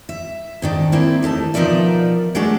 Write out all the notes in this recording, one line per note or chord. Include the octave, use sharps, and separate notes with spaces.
E5
G#2 D#3 D4
A#3 C4 E4
D#2 A3 D#4 A5
B2 F3 D#4 A#4 D5 E5
F#3 G#3 A3 D4 D5